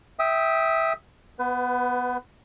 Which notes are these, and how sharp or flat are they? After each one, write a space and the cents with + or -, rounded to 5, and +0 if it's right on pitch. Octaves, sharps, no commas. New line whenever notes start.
E5 -10 G5 +0 D#6 +15
B3 +0 B4 +30